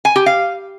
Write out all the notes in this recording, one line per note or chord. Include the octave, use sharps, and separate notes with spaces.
G#5
G4
F5